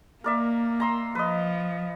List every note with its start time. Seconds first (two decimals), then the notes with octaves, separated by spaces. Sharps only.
0.24 A#3 A#4 D5 E5
0.80 A#5 C6 E6
1.15 F3 B4 D#5